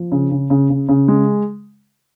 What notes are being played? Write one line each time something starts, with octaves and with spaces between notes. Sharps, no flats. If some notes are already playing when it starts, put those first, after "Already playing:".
Already playing: F3
C#3
C#3
C#3
C#3
C#3
G#3